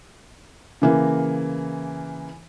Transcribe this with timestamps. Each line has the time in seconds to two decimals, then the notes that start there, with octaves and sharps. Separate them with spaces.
0.82 C#3 E3 A#3